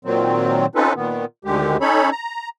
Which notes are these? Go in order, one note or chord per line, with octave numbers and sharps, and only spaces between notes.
A#2 D#3 F#3 C4
C4 C#4 D#4 F4 A4 B4
A#2 D#3 B3
D2 D3 D#3 G#3 G4
C#4 D#4 A4 C#5 B5
A#5